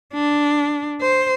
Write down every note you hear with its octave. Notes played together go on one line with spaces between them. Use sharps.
D4
C5